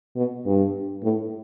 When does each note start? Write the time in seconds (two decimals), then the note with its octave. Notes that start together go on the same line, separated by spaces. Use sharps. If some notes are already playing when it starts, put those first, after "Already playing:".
0.16 B2
0.46 G2
1.03 A2